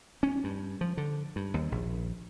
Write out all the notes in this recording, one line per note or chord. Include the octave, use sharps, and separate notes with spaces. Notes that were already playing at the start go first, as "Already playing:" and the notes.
C#4
G2
F3
D3
G2
D#2
A#1